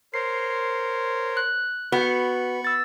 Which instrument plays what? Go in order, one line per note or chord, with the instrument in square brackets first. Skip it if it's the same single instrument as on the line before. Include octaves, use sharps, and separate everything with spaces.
[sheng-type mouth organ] A#4 C5 C#5 [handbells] C7
[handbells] F#6
[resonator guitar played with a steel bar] B3 [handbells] F#4 F#5 [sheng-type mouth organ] B5 C#6
[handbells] E6 A6